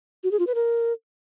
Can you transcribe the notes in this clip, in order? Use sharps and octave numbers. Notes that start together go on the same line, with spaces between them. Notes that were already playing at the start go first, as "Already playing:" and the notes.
F#4
G#4
F4
B4
A#4